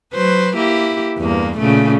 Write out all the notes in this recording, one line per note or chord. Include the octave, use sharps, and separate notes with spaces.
F#3 B4 C5
A#3 E4 G4
E2 G2 A#3
A#2 C#3 A3